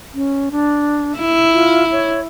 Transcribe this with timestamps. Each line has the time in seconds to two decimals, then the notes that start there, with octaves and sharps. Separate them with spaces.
0.14 C#4
0.51 D4
1.18 E4
1.53 F4
1.92 C#5